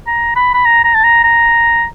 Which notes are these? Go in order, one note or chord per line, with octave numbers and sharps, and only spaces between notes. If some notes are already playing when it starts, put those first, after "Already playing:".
A#5
B5
B5
A#5
A#5
A5
A#5
A#5